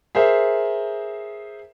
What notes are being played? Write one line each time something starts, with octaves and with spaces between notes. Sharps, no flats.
G#4 A#4 C5 E5